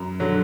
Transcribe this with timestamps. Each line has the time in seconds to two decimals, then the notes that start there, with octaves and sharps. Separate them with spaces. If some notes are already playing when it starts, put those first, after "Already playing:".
Already playing: F#2 A#5
0.20 D3 F#3